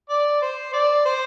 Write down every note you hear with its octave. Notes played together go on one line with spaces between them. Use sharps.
D5
C5
D5
C5